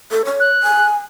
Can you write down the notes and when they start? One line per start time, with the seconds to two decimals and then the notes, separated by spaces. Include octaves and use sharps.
0.11 A4
0.25 C#5
0.40 F#6
0.63 G#5